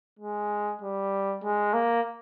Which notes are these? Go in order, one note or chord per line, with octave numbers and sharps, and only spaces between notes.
G#3
G3
G#3
A#3